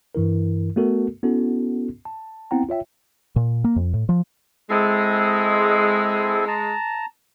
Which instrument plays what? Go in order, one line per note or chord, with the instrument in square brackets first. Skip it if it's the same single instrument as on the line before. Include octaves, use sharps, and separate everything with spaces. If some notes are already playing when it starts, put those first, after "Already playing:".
[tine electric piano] G2 E3 E4 A#4
A3 B3 F#4 A4 A#4
B3 C#4 E4 F#4 A4
A5
B3 C4 E4 F#5 G5 A#5
F4 C#5 E5 G5
[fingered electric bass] A#2
A#3
F2
A2
F3
[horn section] G#3 [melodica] C4 E4 A4
[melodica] A5 A#5